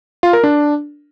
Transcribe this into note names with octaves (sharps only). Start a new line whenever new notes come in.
F4
A#4
D4